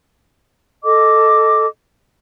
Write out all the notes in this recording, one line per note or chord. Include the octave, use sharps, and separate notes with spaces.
A4 D#5 D6